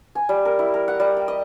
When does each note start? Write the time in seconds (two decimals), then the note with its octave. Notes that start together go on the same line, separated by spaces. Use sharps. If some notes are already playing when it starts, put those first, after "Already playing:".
0.15 G#5
0.29 G3
0.45 A#4
0.59 E4
0.74 A#4
0.88 F#5
1.00 G3
1.17 G5
1.28 D#5